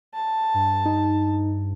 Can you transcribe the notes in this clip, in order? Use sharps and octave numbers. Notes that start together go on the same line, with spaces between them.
A5
G2
D#4